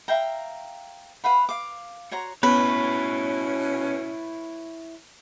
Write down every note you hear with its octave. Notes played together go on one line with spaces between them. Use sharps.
E5 F5 G5 A#5
B4 F5 F#5 B5
F5 D6
F#4 C#5 A#5 C6
B2 B3 C#4 E4 B4 C#5